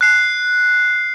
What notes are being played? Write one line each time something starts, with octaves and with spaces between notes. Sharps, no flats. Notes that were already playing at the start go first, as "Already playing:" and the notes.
F#6 C7